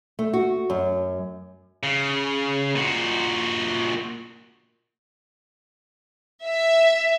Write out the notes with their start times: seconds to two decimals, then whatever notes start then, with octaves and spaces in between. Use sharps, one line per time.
0.19 A3
0.33 F#4
0.70 F#2
1.83 C#3
2.75 A#2 F#4
6.45 E5